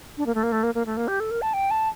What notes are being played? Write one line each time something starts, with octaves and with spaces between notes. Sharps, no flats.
D4
A#3
A3
A#3
A3
A#3
A#3
A3
A#3
G4
A4
A#4
A5
G5
A5